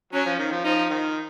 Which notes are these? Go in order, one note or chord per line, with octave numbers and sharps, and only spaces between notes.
F#3 C#4
F3
D#3
F3
F3 D#4
D#3